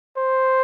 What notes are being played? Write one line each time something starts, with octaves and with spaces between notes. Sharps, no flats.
C5